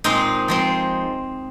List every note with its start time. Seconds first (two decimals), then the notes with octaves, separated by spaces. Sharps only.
0.04 A#2 G#3 C4 D#4
0.48 F3 G#3 C4